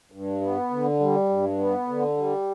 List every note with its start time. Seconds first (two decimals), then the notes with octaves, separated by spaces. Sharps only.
0.12 G2
0.41 B3
0.70 D3
1.00 G3
1.29 G2
1.58 B3
1.88 D3
2.17 G3